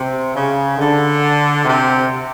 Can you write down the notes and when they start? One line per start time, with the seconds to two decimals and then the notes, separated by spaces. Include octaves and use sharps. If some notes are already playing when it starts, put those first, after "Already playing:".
Already playing: C3
0.35 C#3
0.78 D3
1.65 C3